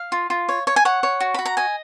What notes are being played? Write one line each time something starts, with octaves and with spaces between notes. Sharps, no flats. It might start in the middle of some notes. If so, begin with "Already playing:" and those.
Already playing: F5
F4
F4
C#5
C#5
G#5
C#5 F#5
C#5
F#4
F#4 B5
A#5
D#5 G#5